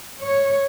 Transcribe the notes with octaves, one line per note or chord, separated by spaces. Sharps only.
C#5